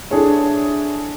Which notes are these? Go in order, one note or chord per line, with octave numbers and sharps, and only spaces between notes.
D4 E4 G#4 A4 C#5 E5